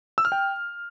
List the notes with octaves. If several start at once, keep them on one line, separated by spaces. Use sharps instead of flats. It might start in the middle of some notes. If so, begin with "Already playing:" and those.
E6
F6
G5